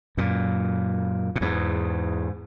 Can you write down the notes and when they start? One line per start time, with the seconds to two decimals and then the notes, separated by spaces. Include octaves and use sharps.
0.17 F#2 A#2
1.36 A#2
1.41 E2 G#2